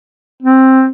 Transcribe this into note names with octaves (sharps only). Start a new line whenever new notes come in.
C4